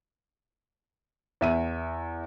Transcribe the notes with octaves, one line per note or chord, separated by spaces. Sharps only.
E2 E5 D#7